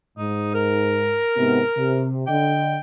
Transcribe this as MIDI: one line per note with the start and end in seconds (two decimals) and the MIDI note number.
0.18 1.18 44
0.18 0.52 63
0.54 2.07 70
1.35 1.60 44
1.35 1.60 48
1.35 1.60 59
1.75 2.25 48
2.27 2.76 50
2.27 2.76 75
2.27 2.79 79